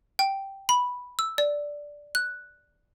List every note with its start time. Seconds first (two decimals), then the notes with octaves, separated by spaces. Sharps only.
0.19 G5
0.69 B5
1.19 E6
1.38 D5
2.15 F#6